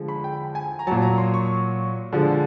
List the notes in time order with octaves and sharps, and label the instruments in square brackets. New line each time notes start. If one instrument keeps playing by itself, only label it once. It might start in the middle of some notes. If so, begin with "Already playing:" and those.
Already playing: [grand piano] D3 F3 G#3
B5
G5
G#5
A#5
F#3 A5
A#2
A#5
C6
C#6
D3 F3 G#3